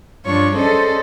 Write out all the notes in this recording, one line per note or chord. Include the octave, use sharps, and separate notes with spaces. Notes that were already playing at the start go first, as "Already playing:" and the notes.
G2 F3 D4 F4 C#5 C#6
C#4 G#4 A4 C5 D5 D#5